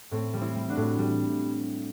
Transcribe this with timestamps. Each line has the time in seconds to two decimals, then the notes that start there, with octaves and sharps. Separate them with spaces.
0.11 A2 C4
0.34 G3
0.41 C4 E4
0.55 G3
0.69 D4 F#4
0.77 A2
0.98 G3